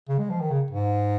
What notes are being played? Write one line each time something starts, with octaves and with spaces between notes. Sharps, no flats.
C#3
G#3
F3
D#3
C#3
G#2